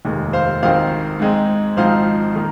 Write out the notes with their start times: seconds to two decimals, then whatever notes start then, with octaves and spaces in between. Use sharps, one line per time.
0.05 F1 D#2 D#3 G#3
0.33 C5 F5
0.62 G#1 G#2 D#3 C4 C5 F5
1.19 G#2 G#3 C4 D#4
1.77 G#1 G#2 F3 C4 D#4 C5 F5
2.35 D#3 A#3 D#4